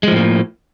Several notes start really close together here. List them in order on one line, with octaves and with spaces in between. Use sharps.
G#3 F3 A2 A#3